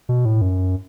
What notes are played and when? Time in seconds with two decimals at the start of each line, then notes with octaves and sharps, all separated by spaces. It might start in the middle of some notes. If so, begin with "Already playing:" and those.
0.09 B2
0.25 A2
0.41 F#2